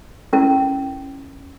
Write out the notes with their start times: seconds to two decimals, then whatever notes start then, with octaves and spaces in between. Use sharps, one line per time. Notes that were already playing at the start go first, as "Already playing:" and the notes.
0.33 C#4 E4 A#4